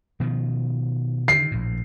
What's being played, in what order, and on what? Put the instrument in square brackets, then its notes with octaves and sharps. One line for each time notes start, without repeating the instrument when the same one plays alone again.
[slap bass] B2 D#3 F3
[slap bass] D3 D#3 [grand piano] C7
[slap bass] A#1 A2